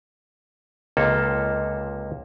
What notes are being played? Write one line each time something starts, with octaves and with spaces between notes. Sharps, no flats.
C#2 C3 A#3 A4